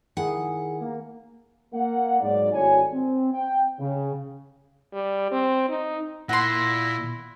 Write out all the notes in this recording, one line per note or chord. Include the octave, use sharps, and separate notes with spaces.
D#3 E4 G#4 F#5
A#3
A#3 F#5
G#2 F#3 D5
G#1 A2 G3 F#4 C#5 G#5
C4
G5
C#3
G3
C4
D#4
A#2 E4 F#5 C6 A#6